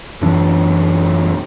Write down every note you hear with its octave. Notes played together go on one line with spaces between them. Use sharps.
F#2 B2 E3 D4